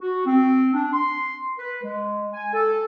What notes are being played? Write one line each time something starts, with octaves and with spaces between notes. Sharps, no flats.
F#4
C4
D4
C6
B4
G#3
G#5
A4